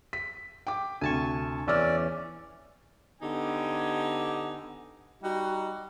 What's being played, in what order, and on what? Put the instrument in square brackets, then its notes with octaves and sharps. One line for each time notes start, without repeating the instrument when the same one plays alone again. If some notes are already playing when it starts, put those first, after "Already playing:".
[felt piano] B6
G5 D6
[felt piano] D2 C3 [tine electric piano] G#5 A5 C#6
[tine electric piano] E2 E3 C#4 [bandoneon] D5 [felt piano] E6 F6
[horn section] D3 B3 D#4 G4 G#5
G3 D#4 F#4